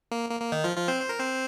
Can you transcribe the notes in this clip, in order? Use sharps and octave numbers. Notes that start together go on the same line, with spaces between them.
A#3
A#3
A#3
D#3 D#4
F3 F4
F3 F4
C4 C5
C5
A#4
C4 C5